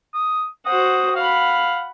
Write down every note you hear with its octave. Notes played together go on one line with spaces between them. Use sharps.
D#6
F#4 C5 F#5 D#6
F5 F#5 B5